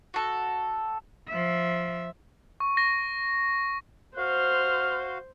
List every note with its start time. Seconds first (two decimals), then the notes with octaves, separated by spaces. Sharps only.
0.14 F#4 A4
1.28 F3 E5
2.60 C#6
2.77 A#6
4.17 F#4 C5 F5 F6